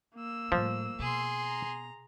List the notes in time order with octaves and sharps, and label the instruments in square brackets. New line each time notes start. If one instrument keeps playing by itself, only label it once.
[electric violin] A#3 E6
[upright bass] A2 G3 [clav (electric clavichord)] F3
[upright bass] B2 [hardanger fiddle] G#4 C6
[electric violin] A#5